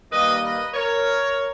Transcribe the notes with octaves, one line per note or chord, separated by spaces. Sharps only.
D#3 G3 A#3 B4 D#5
B4 D#5
A#4 C#5